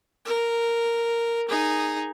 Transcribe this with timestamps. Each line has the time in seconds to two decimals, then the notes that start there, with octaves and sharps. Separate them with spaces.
0.25 A#4
1.48 D#4 G#4